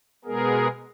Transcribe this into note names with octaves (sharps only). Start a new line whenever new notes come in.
B2 G#3 B3 G#4 A#4